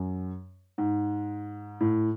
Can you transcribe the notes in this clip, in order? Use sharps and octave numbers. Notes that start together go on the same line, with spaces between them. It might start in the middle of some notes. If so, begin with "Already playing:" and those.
Already playing: F#2
G#2
A2